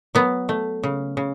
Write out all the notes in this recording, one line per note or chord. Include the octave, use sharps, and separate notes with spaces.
F#3 B3
A3
C#3
C#3